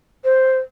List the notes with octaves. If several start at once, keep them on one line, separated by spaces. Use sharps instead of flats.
C5